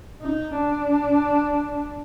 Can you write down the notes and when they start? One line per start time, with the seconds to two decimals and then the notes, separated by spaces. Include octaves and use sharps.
0.21 D#4
0.57 D4